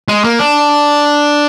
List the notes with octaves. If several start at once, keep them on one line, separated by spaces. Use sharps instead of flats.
G#3
A#3
D4